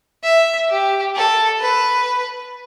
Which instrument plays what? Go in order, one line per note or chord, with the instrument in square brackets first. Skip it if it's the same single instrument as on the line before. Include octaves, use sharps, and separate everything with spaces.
[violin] E5
G4
A4
B4